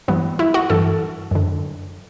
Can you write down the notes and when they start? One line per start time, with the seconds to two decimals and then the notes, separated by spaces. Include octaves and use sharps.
0.08 G2 E3 B3
0.39 E4
0.54 F#4
0.70 G2 E3 A4
1.31 F#2 D3